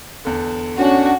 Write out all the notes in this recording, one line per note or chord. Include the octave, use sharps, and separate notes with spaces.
E2 D3
C#4 D4 F#4